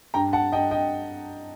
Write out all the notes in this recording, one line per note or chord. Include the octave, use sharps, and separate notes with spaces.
G2 G5 A#5
F#5 A5
G2 D#5 G5
D#5 G5